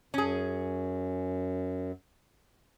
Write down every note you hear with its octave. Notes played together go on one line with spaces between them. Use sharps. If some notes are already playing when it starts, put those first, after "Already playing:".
F#2 C#4 G#4